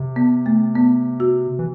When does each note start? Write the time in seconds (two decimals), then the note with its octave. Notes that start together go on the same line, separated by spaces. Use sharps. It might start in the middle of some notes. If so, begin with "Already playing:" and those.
Already playing: C3
0.16 B3
0.46 A3
0.75 B3
1.20 F#4
1.59 E3